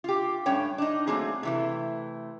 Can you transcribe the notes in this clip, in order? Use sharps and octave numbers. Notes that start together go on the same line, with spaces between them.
F4 G4
G2 A3 C#4 C#5 G5
D4 D#4
F#3 A3 A#3 C4 G#4
C3 E3 A3